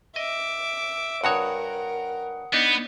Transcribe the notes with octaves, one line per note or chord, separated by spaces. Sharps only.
D#5 E5 D6
G2 F#4 A#4 C#5 F#5 D#6
B3 D4 D#4